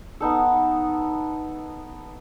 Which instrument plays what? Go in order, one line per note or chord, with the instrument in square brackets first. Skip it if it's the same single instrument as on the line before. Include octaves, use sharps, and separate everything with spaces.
[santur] B3 D#4 A4